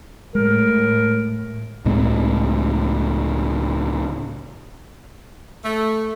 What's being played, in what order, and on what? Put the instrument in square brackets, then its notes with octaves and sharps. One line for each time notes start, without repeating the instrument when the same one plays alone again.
[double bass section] A2 [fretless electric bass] G#3 [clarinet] A#4
[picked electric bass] C#2 A2 G#3 C4
[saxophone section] A3